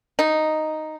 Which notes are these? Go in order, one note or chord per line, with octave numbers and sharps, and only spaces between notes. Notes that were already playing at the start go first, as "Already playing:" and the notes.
D#4